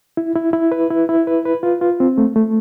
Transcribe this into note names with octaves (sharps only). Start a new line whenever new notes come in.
E4
E4
E4
B4
E4
E4
B4
B4
F4
F4
C4
A3
A3